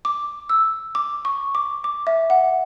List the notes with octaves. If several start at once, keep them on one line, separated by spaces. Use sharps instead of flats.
D6
E6
D6
C#6
D6
D6
E5
F#5